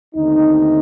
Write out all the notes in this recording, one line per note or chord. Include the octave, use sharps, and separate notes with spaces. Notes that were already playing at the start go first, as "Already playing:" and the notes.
D#2 D3 A3 C4 D#4